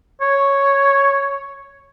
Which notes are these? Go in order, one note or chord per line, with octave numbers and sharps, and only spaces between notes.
C#5